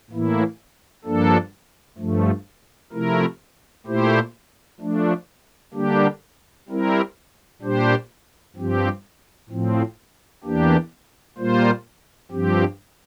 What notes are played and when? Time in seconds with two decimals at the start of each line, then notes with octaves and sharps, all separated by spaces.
0.11 A2 E3 A#3 E4
1.05 G2 F3 A#3 D4 A4
1.98 G2 F3 A3
2.92 C3 F3 A3 E4 A#4
3.86 A#2 A3 E4 G4 C5
4.80 F3 A3 D4
5.74 D3 G3 A#3 D4 G4
6.69 G3 C4 E4 A#4
7.62 A#2 G3 D4 G4 C5
8.56 G2 F3 C4 G4
9.50 A2 F3 C4
10.44 E2 E3 A#3 D4 G4
11.38 A#2 G3 A#3 F4 C5
12.31 G2 F3 C4 G4